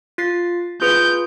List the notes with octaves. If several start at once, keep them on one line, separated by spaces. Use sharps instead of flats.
F4 A6 C7
F4 G#4 B4 G6